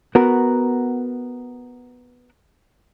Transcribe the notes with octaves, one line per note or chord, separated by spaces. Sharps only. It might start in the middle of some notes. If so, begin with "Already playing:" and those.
B3 F#4 A#4